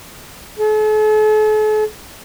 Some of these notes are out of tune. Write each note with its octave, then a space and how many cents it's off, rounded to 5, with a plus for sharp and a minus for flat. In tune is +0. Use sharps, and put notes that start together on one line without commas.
A4 -45